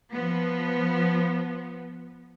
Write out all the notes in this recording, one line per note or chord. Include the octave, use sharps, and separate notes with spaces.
F3 B3